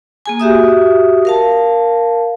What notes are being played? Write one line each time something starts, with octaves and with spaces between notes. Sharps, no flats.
A#3 G#4 G#5
F#4 G4 E5 D#6
A#4 F5 A5